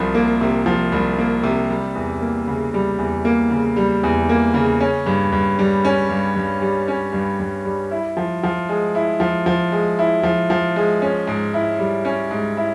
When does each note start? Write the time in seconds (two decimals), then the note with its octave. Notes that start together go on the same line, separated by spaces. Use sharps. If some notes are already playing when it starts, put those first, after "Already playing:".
Already playing: C2 C3 F3
0.14 A#3
0.41 C3
0.66 F3
0.92 C2
1.18 A#3
1.43 C3
1.70 G3
1.95 E2
2.21 A#3
2.47 C#3
2.74 G3
2.99 E2
3.25 A#3
3.50 C#3
3.76 G3
4.03 E2
4.29 A#3
4.54 C#3
4.80 C#4
5.06 G2
5.32 G2
5.59 G3
5.85 C#4
6.09 G2
6.36 G2
6.61 G3
6.88 C#4
7.13 G2
7.40 G2
7.65 G3
7.91 E4
8.17 F3
8.43 F3
8.69 G#3
8.95 E4
9.20 F3
9.46 F3
9.72 G#3
9.99 E4
10.23 F3
10.50 F3
10.76 G#3
11.02 C#4
11.27 G#2
11.54 E4
11.79 G3
12.05 C#4
12.31 G#2
12.57 E4